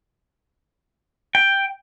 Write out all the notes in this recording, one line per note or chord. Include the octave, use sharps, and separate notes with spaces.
G5